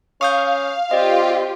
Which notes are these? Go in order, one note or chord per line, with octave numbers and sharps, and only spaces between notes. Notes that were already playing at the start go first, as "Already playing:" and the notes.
C#4 F5 C#6 D#6 G6
C4 F4 G4 D5 D#5